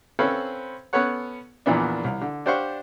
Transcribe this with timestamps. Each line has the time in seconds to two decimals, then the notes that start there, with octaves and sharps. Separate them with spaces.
0.19 C4 C#4 A4 B4 C5 F5
0.93 B3 C#4 A4 C#5 F#5
1.66 A#1 E2 A#2 E3 B3 D4
2.04 C2
2.21 D3
2.46 D4 G4 C5 F5 F#5 C#6